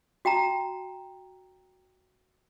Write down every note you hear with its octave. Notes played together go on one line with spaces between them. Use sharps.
F#4 G5 A5 A#5